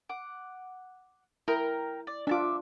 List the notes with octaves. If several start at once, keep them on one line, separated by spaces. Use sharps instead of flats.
F#5 D6
E4 A#4 G5
D5
D4 F4 E5 A5 D6